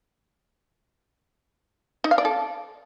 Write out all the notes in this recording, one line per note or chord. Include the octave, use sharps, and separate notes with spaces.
D#4
F5
D5
A4